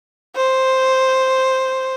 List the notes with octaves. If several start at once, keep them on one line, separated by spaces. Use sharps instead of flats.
C5